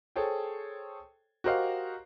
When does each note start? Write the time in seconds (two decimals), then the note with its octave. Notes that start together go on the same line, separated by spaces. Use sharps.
0.16 G#4 A4 C5 C#5 G5
1.44 F#4 G4 A#4 C5 D#5 F5